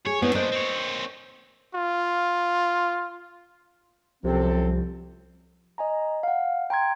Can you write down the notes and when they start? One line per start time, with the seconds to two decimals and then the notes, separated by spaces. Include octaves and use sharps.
0.06 G#4 C#5
0.22 G#2 A3 B3 E4 C#5
0.35 A#2 D4 A#4 C5 D#5
0.52 C4 C#5
1.74 F4
4.24 C2 F#2 C3 F3 C4 A4
5.78 D#5 G#5 A#5
6.23 F5 F#5
6.70 G5 A#5 C6 G#6